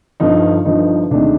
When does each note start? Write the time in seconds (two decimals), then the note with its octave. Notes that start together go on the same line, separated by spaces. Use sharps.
0.20 G1 G2 D3 F3 D#4
0.65 G1 G2 D3 F3 D#4
1.11 D2 C3 D#3 G#3 D4